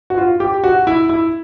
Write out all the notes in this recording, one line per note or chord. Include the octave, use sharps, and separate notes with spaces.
F#4
F4
G4
F#4
E4
E4